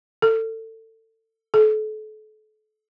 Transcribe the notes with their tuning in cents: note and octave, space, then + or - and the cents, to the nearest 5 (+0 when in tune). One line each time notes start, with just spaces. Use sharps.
A4 +25
A4 -35